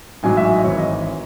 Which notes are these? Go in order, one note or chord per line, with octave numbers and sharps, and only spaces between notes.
A1 G#2 F#3 G#5
E5
D#5
G#1 G#2 E3 C#5
D#5